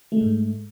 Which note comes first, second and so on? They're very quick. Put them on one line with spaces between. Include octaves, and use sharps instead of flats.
A3 G#3 G#2